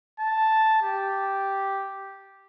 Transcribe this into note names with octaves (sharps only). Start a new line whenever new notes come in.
A5
G4